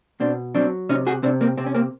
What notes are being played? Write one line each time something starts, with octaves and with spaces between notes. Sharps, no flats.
B2 C4 D4
F#3 C4 D4
C3 C#4 D#4
F#4 G#4
C3 C4 D4
A#3 C4
C3 C4
C#4
A#3 C4